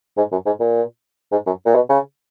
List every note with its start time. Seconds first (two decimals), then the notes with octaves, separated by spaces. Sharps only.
0.17 G#2
0.32 F#2
0.46 G#2
0.60 A#2
1.32 G#2
1.46 F#2
1.66 A#2
1.75 B2
1.89 C#3